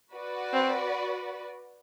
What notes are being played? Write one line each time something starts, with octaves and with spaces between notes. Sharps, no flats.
F#4 B4 D5
C4